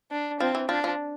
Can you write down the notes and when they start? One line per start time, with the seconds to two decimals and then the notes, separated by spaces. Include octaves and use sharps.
0.11 D4
0.40 F3 C4
0.55 E3
0.69 F3 D4
0.84 F3